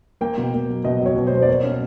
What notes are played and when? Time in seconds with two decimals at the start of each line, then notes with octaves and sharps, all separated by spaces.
0.21 A#3 G5
0.38 B2
0.54 A#3
0.69 F#3
0.84 B2 D#5
1.00 F#3
1.06 C#5
1.16 B2
1.27 C5
1.32 B2
1.42 D5
1.48 A#3 C#5
1.63 C#4